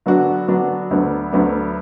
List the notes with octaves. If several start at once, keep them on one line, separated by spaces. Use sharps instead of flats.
D3 F#3 B3 D4 F#4
D3 F#3 B3 D4 F#4
D2 D3 F#3 B3 D4
D2 D3 F#3 B3 D4